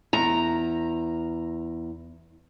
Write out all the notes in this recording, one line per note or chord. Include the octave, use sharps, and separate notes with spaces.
E2 A#5